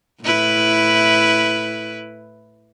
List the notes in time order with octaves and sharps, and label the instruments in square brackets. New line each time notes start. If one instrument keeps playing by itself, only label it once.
[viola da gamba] A2 E4 B4